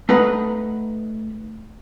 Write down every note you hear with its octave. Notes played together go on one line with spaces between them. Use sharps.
A3 D#4 B4 F#5 A#5 B5